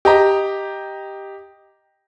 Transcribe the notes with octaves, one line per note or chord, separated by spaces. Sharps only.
G4 D#5 A#5